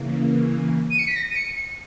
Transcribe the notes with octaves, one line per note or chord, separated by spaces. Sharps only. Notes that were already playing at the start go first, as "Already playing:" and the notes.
Already playing: C#3 E3 A#3
D#7
C#7
B6
A#6
D#7
C#7
C#7